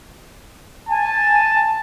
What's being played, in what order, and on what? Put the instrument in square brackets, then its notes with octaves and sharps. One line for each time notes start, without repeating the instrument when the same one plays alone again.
[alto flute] G#5 [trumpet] A5